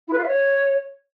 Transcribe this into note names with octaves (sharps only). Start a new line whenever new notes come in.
E4
B4
F4
E5
C#5